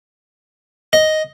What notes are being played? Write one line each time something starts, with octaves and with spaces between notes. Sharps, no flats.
D#5